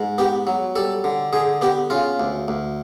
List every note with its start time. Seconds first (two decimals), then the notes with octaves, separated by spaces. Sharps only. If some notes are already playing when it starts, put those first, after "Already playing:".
Already playing: G#2
0.18 B3 G4
0.47 F#3
0.76 G3 A4
1.04 D3
1.33 D3 G#4
1.61 B3 G4
1.90 C#3 F4
2.20 D2
2.48 D2